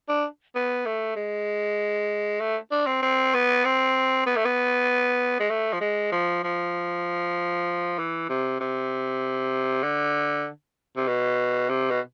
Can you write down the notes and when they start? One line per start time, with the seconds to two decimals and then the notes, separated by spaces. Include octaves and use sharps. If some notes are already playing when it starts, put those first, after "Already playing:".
0.08 D4
0.55 B3
0.86 A3
1.16 G#3
2.40 A3
2.72 D4
2.87 C4
3.02 C4
3.34 B3
3.65 C4
4.26 B3
4.36 A3
4.45 B3
5.40 G#3
5.50 A3
5.73 F3
5.81 G#3
6.12 F3
6.43 F3
7.98 E3
8.29 C3
8.60 C3
9.83 D3
10.96 C3
11.07 B2
11.69 C3
11.90 B2